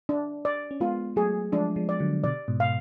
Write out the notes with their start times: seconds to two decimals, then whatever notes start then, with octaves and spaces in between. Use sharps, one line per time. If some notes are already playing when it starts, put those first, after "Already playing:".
0.09 D4
0.45 D5
0.71 C#4
0.80 G#3 B3 F4
1.16 F#3 A3 G#4
1.52 F3 G#3 D4
1.76 F3 G#3
1.89 D5
2.00 D3 F#3
2.24 B2 D3 D5
2.48 G#2 B2
2.60 F5